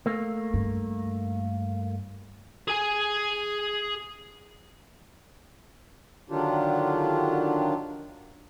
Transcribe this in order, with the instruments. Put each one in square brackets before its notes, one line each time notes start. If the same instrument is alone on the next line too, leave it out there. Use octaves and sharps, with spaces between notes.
[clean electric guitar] A3 A#3
[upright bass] G2
[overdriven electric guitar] G#4 G#5
[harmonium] D3 D#3 F#3 D4 F4 G4